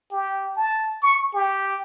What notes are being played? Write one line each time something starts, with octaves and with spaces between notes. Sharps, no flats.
G4
A5
C#6
G4